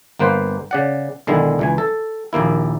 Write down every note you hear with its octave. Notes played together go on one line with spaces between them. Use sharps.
G1 A#3 B4 C5
C#3 D5 F#5
B1 D3 D#3 G#3 E4
C#2 E3 G#5
A4
A#1 D#2 A#3 E4